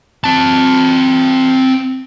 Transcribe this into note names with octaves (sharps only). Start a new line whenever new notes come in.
C4 A5